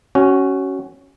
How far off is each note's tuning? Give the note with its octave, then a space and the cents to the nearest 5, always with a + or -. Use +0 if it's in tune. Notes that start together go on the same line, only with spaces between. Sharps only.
C#4 +0 F#4 +25